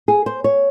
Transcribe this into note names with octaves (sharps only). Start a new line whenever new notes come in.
G#4
C5
C#5